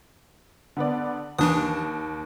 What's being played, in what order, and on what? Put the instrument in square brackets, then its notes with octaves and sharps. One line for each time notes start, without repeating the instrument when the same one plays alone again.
[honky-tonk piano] D3 B3 D5
[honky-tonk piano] D#2 [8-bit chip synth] E3 D4 D#6